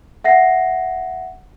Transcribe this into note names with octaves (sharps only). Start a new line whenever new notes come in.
E5 F#5 A#6 C7